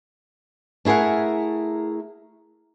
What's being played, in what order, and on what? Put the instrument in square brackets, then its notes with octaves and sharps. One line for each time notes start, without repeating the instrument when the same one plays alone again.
[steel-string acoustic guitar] A3 E4 G#4 A#4 F#5